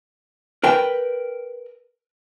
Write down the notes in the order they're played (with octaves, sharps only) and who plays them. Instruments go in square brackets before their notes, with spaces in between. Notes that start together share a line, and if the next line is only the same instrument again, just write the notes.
[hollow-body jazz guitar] A#4 B4 G5